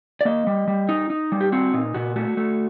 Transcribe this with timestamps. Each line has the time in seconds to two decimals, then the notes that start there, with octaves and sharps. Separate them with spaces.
0.21 D5
0.25 A#3 D#5
0.47 G3
0.68 G3
0.89 D#4
1.10 D#4
1.32 G3
1.41 G4
1.52 C4 F#4
1.73 A#2 D#4
1.94 A#2 F#4
2.16 A3 F#4
2.37 A3